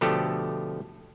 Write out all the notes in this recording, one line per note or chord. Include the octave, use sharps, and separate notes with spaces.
B2 D3 F3 A3 G4 A4